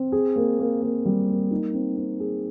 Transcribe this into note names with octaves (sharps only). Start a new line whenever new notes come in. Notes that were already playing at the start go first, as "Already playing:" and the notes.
Already playing: C4
G#4
A#3
A#3
A#3
G3
A#3
D#4
C4
C4
G#4